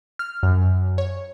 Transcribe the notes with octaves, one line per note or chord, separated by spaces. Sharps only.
F6
F#2
C#5